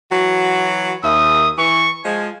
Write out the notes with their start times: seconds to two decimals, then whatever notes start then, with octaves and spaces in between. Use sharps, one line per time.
0.11 E3 F#3 F#4
1.04 D#2 E5 D#6
1.58 E3 C#6
2.05 F3 G#3 G#5